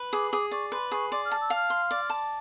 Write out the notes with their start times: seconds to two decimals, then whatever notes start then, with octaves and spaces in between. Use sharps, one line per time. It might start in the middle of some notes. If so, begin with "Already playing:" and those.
Already playing: B4
0.13 G#4 D6
0.32 G#4 D6
0.51 D5 C#6
0.72 B4 C6
0.92 G#4 C#6
1.11 D5 C6
1.25 F6
1.32 A5
1.41 E6
1.50 F5
1.56 F6
1.70 C6
1.91 D5
2.10 A5